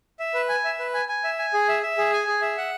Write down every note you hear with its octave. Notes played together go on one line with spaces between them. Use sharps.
E5
B4
G#5
E5
B4
G#5
G#5
E5
G#5
G#4
E5
E5
G#4
G#5
G#4
E5
F#5